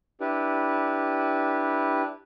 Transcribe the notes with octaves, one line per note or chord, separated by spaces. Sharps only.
D4 E4 G4 B4